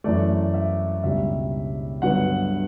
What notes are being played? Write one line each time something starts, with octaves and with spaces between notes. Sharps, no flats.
F#2 E3 A3 D5
E5
C#2 B2 G3 D4 E5
G2 D3 F#3 B3 F#5